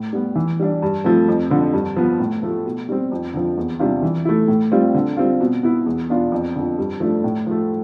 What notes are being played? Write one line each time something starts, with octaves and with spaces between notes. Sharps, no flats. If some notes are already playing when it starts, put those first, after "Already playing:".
Already playing: A2
G3 B3
E3
G3 D4
G2
F3 A3 C4
F2
D3 F3
G2
F3 B3
A2
F3 A3
B2
G3 C4
F2
D3 F3
E2
C3 G3 D4 F4
E3
A3 E4
A2
G3 C4 F4
D3
G3 C4 F4
B2
B3 E4
E2
B2 B3 D4 F4
F2
D3 F3
G2
F3 A3 D4
A2
F3 A3